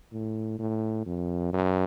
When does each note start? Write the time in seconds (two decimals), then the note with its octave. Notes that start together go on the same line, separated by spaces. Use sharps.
0.12 A2
0.59 A2
1.06 F2
1.53 F#2